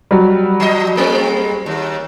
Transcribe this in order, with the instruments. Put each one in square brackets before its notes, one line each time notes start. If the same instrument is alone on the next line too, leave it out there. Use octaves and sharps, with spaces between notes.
[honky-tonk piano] F#3 G3
[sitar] F3 D#5
G#3 A3 C4
D#2